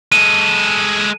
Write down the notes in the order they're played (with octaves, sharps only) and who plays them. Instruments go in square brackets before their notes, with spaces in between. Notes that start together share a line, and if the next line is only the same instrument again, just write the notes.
[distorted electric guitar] G#3 A4 [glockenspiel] D#7